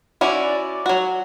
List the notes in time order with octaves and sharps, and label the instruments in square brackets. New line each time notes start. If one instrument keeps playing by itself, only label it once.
[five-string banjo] C#4 E4 F#4 [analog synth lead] D5
[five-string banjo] F#3 F#4